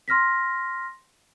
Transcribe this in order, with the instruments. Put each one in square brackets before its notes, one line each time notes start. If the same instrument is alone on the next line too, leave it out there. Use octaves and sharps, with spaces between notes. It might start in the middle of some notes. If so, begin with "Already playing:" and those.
[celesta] C6 F6 A#6 B6